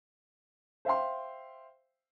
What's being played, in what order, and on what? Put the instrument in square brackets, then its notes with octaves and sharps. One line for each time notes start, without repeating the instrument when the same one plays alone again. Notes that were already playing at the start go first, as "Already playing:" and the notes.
[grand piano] C5 E5 F5 G5 C6